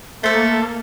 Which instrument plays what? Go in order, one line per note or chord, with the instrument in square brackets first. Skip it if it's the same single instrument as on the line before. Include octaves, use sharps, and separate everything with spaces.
[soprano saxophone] A3 [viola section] A#3 [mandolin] A4 C5